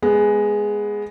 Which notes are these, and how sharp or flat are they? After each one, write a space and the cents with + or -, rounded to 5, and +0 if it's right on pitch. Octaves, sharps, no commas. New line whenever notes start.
G#3 +0 B3 +0